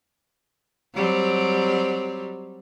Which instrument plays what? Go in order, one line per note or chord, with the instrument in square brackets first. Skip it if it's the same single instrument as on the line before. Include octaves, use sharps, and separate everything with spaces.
[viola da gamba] F#3 G3 C4